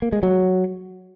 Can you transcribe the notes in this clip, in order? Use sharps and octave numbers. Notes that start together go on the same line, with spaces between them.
A#3
G#3
F#3